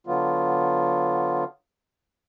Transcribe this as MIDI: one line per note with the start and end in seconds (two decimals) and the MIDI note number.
0.07 1.44 50
0.07 1.44 54
0.07 1.44 59
0.07 1.44 65